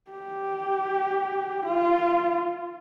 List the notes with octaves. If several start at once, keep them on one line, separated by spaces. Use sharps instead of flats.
G4
F4